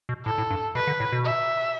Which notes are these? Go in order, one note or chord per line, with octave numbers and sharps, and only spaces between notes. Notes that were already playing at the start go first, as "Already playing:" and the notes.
B2
A2 A4
A2
G2
B2 B4
D3
A2
B2
E5